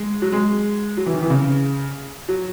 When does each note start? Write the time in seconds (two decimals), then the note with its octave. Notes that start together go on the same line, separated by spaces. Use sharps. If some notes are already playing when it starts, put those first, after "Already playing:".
Already playing: G#3
0.22 F#3
0.33 G#3
0.97 F#3
1.06 E3
1.14 D#3
1.23 E3
1.30 C#3
2.29 F#3